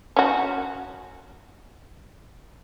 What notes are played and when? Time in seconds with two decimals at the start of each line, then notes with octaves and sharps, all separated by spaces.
0.16 C#4 F#4